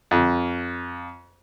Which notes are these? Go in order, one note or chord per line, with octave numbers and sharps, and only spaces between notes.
F2